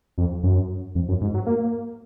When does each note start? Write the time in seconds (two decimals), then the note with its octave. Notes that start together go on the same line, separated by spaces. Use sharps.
0.18 F2
0.43 F#2
0.95 F2
1.09 F#2
1.21 G#2
1.34 F#3
1.46 A#3